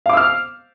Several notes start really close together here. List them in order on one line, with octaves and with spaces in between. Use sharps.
F5 D6 E6 F6